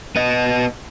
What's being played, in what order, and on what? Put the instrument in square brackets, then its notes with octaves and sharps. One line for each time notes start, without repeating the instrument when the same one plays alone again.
[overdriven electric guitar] B3 D#5